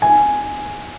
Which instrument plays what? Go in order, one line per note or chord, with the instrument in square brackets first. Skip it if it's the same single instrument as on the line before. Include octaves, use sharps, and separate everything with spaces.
[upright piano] G#5